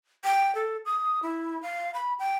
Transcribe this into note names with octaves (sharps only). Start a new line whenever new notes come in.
G5
A4
D#6
E4
F5
B5
G5